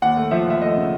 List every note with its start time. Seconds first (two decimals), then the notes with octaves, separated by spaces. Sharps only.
0.02 D#2 F#5
0.17 A3
0.31 F3 E5
0.46 D#2 E5
0.61 A3 D#5
0.77 C#3